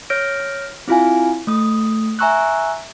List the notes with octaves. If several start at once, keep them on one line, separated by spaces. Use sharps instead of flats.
C#5 F6 G6 A#6 D7
C4 E4 F4 F5 G#5
A3 D#6
E5 G#5 A#5 C#6 E6 F#6